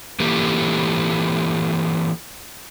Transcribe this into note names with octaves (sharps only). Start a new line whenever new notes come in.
E3 A#3 E4 G4 A4